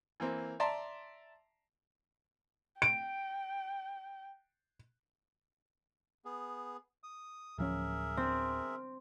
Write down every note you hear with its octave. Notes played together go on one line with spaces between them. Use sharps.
E3 A#3 C4
D5 E5 A5 A#5 C6
G5 D7
B3 G#4
D#6
D1 F3 C#4 G#4 A#4 E5
C4